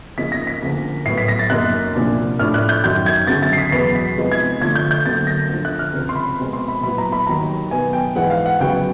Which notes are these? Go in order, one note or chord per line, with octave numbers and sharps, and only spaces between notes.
C#3 F3 A#3 D#4 B6
A#6
B6
D2 C#3 F3 A#3
A2 F#3 B3 C7
B6
A#6
A6
F#2 C#3 F#3 A#3 D#4 F#6
C2 A#2 F3 A#3 D4
A2 F3 A3 D4 F6
F#6
G6
F#2 D#3 F#3 G6
G#6
D2 C#3 F#3 A6
A6
C7
B6
E2 B2 F#3 B3 C7
B6
C3 F3 G#3 B3 D#4
G#6
D3 F3 A3 D4 F4 G#6
G6
G6
D2 D3 F#3 A#3 A6
A#6
D2 D3 F3
F#6
F6
C#2 C3 F3
C6
B5
B2 G#3 C4
C6
B5
A#2 F#3 B3 E4 B5
A#5
B5
D#2 D#3 F#3 A#5
B2 F#3 B3 G#5
G5
G#2 E3 G#3 F#5
F5
F#5
C#2 C#3 F#3 B3 G5